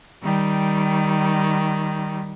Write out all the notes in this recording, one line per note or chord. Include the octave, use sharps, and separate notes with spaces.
D#3 G3